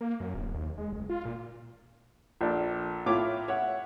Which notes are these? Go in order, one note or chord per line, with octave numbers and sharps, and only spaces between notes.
A#3
F#2
D1
D#2
G#3
F#1
F4
A#2
A#1 D4 A4
A2 E4 F4 C#5 D6
C#5 E5 F#5